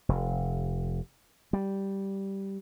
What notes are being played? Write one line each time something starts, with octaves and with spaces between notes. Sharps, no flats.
F1
G3